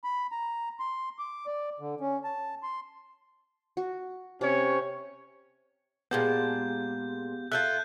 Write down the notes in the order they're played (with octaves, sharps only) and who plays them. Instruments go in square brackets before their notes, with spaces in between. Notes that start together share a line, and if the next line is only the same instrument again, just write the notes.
[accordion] B5
A#5
C6
D6
D5
D3
C#4
A5
C6
[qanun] F#4
[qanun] C3 [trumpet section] C#4 C#5
[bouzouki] A#2 G#3 A5 [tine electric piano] B3 G4 F5 [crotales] G6
[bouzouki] F4 G#4 A4 [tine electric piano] E5 [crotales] F#6 G6